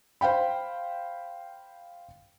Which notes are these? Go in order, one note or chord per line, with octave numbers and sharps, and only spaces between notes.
C5 F5 G5 B5